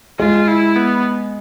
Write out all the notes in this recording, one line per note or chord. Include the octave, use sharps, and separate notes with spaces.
G#3 F4
E4
B3